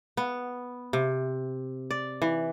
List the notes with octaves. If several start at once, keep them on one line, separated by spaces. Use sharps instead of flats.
B3
C3
D5
E3